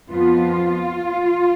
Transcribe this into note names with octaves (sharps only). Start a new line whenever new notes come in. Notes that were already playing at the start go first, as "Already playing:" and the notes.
F2 F3 B3 F4